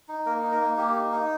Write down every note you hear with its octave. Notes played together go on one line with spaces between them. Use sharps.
D#4
A#3 A#4
D#4
A#4
A#3
A#3 G4
D#4
D#4